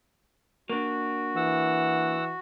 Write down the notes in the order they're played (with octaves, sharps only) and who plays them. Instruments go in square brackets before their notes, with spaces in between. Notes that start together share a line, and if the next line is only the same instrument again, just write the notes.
[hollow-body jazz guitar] A#3 D4 [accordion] F#4
[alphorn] E3 [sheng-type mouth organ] F#5 E6